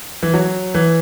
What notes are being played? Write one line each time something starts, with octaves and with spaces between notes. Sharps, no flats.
E3
F#3
E3